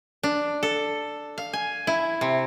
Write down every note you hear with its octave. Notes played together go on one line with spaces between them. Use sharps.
D4
A4
F5
G#5
E4
C3